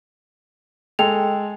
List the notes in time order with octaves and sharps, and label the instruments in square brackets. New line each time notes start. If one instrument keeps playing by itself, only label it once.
[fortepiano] G#3 A4 [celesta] G5 F7